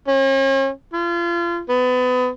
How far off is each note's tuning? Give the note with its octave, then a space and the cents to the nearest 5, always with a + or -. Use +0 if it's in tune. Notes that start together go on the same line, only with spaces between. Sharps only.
C#4 -40
F4 -30
B3 +30